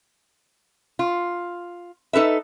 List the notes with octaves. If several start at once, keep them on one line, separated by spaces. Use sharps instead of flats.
F4
D#4 A4 B4 E5